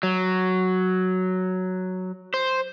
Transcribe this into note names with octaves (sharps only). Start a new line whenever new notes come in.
F#3
C5